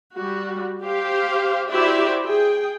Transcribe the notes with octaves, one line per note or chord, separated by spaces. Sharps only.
G3 F#4
G4 C5 F5
E4 F#4 G4 C5 D5 E5
G#4 G5